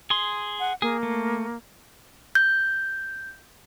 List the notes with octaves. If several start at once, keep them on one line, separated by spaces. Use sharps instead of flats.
G#4 C6
F#5
A#3 G#4
A3
G6